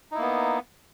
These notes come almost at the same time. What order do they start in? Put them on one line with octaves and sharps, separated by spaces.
D#4 E4 A#3 B3